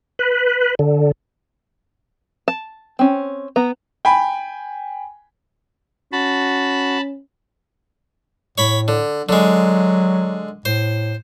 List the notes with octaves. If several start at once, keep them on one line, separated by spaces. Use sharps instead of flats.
B4
D3
A5
C4 C#4
B3 A#5
G5 G#5 B5
C#4 F#4 A5 B5
A2 C#5 B5
D3
D3 F#3 G#3
A2 C5